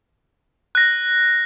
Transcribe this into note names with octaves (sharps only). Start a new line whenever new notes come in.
F#6 A#6